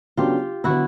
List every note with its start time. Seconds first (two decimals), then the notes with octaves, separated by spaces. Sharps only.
0.17 C#3 F#3 B3 D4 F4 G4
0.64 D3 F#3 B3 E4 F#4